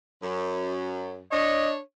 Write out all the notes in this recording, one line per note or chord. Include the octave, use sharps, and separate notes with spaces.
F#2
D4 C#5 D#5